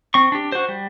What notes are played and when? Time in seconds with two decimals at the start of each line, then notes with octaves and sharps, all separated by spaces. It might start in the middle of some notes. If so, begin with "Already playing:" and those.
0.14 C4 C#6
0.32 D4 G4
0.52 F#4 C5
0.69 G3